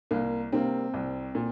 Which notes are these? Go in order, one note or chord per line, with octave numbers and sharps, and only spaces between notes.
C2 A#3
C3 G3 A#3 C4
C2
A#2